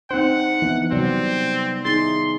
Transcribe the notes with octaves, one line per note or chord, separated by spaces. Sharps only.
C4 D4 D#4 C5 F#5
E3 B3
C3 F#3 G3 C4 D5
D#4 E4 G#4 C6 A6